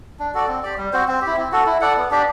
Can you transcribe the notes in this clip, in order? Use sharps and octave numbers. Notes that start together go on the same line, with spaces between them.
D4
F#4 A4 D5
C4
G4 D5
G3
C4 F#4 C5
C4
E4 G4
C4
F#4 A4
E4
A4 D5 F#5
B3
D4 G4 D5